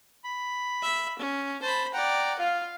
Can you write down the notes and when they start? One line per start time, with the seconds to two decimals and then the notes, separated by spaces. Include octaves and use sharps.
0.24 B5
0.82 E5
1.19 C#4
1.62 C5 A5 B5
1.94 D5 F#5 G5 A#5
2.39 F4 F5